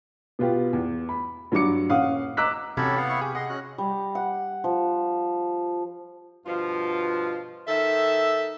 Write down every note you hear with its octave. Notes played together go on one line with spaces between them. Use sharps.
B2 B3 F4 G4
E2
B5
G2 F#3 F#4 D6 C#7
D#1 C#4 F5 F#5 D#6
D#5 A#5 D6 E6 F#6 B6
A1 C3 C#4 F#4 G4 A4 C#5 B5
B3 F5 F#5
E4 C#6
G4 G#4
G#4 D#5 F#5 C6
C#4 F#4 F#6
G3
F#5
F3
G2 B2 F3 F4
D#3 A4 E5